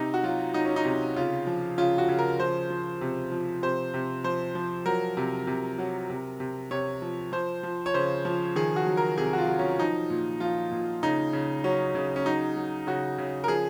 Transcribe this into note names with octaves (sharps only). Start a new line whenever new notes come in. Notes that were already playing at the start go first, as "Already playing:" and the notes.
Already playing: C3 D#4
F#4
F#3 F4
F#3 D#4
C#4
D#4
C3
C#3 F4
F3
C#3 F4
F#4
C#3
A#4
F3 C5
F3
C3
F3
C3 C5
C3
F3 C5
F3
F#3 A#4
C3
C3
F#3
C3
C3
C3 C#5
F3
F3 C5
F3
C#5
C#3 C5
F3
D#3 G#4
F#4
F#3
A#4
C3 G#4
F#4
F4
F#3
C#4
F3 D#4
A#2
F3 F4
A#2
C#3 D#4
C#3
F#3 C#4
C#3
C#4
F#3 D#4
F#3
C#3 F#4
C#3
A#4
F3 G#4